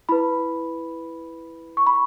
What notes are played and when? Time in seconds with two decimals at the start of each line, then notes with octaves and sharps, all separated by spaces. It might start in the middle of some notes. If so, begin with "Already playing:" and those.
0.09 E4 B4 B5
1.77 C#6
1.87 B5